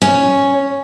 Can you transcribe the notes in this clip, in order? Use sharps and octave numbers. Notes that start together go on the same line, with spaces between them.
C#4 C#5